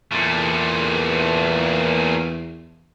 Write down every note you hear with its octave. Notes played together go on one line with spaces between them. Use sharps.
E2 A#2 A3